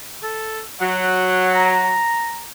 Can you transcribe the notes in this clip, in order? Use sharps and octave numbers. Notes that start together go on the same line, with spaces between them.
A4
F#3 F#5
A#5